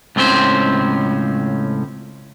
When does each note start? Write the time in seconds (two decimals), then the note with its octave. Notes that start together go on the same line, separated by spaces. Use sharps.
0.16 C#2 A2 C4 C#4 C5